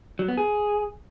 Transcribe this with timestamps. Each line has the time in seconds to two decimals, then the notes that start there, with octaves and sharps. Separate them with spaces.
0.19 F#3
0.28 B3
0.37 G#4